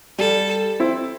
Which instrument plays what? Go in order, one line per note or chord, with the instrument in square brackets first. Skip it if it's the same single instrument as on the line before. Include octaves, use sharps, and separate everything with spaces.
[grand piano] G3 [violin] A4
[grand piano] C4 E4